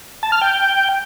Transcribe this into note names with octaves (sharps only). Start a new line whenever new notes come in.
A5
F6
G5